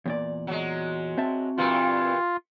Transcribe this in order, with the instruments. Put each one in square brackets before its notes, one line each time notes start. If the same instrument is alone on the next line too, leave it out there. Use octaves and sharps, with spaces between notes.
[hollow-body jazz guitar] E2 A#2 D5
[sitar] F#3 G#3
[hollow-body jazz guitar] C4 E5 A5
[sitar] G2 A#2 E3 [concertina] F4